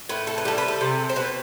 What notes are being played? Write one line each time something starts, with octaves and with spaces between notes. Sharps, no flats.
A2 B4
A4
B4
G3 A4
B4
A4
C3
C5
B2 B4